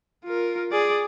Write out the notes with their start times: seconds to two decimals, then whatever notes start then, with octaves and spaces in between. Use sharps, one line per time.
0.25 F4 A#4
0.72 G#4 D5